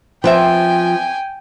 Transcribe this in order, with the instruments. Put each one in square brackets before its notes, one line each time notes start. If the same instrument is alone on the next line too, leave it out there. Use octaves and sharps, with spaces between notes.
[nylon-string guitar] F3 [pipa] B3 C4 E5 [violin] G5 G#5